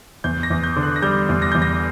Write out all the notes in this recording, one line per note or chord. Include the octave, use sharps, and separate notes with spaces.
E2 G6
A#6
E2
G6
D3
F#6
A#6
G3 G6
E2
A#6
E2 G6
A#6